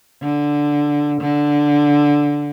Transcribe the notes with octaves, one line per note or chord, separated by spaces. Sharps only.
D3
D3